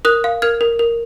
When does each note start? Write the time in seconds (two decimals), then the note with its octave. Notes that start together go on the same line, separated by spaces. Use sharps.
0.05 A#4 D#6 F#6
0.24 F5
0.42 A#4 F6 G#6
0.61 A#4
0.79 A#4